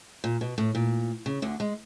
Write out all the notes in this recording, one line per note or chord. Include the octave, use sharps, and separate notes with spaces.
A#2
B2
A2
A#2
C#3
D2 D3
G#3